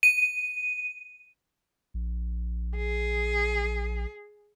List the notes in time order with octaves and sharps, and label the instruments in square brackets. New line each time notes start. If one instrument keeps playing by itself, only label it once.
[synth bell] D#7
[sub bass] A#1
[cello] G#4